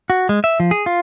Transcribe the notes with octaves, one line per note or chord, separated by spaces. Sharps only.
F#4
G#3
E5
F3
G#4
F4